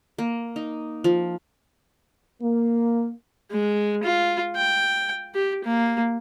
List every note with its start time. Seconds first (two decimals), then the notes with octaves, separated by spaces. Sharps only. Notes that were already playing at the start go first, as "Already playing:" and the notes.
0.18 A#3
0.56 D#4
1.04 F3
2.42 A#3
3.51 G#3
4.03 F4
4.56 G5
5.35 G4
5.64 A#3